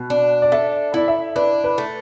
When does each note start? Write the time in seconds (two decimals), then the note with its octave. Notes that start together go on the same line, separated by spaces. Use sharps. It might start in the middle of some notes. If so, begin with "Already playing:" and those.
Already playing: B2
0.10 D4
0.42 D5
0.52 A4 E5
0.94 E4 D5
1.08 E5
1.36 D4 B4
1.64 B4
1.78 A3